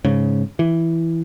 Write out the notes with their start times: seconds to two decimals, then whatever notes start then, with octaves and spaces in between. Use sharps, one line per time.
0.05 G#2 C#3
0.59 E3